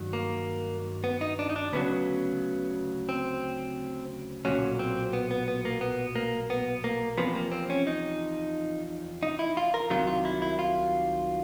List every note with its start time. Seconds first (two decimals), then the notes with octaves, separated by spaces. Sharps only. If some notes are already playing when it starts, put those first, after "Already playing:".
Already playing: G2 D#3 F#3
0.13 A#3
1.04 B3
1.21 D#4
1.39 D4
1.49 D#4
1.56 D4
1.73 D2 C#3 F#3 B3
3.09 C4
4.45 B1 A#2 F#3 C#4
4.79 C4
5.13 B3
5.31 B3
5.48 B3
5.65 A#3
5.81 B3
6.15 A#3
6.50 B3
6.84 A#3
7.18 E2 C3 F3 B3
7.35 A#3
7.52 C4
7.70 C#4
7.87 D#4
9.23 D#4
9.39 E4
9.57 F4
9.74 A#4
9.90 C2 C3 D#3 F#3 F4
10.07 F4
10.25 E4
10.42 E4
10.59 F4